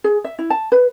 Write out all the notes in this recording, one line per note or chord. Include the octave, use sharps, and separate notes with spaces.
G#4
E5
E4
A5
B4